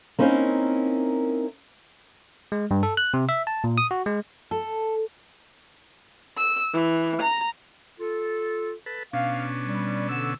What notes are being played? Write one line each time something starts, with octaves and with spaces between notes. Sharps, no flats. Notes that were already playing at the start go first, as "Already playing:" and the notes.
A#3 C4 C#4 D#4 E4 A#4
G#3
G2
A4
F#6
C3
E5
A5
A#2
D#6
F#4
G#3
A4
E6
E3
A#5
F4 A4
A4 B4
B2 C#4 D4 F5
G3
D3 E6